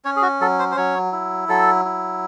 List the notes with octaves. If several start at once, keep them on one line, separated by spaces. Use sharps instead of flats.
C#4 C#5
G#4
F#4
F#3 A4
C5
C5
F#3 C#5
E4
F#3 A4
E4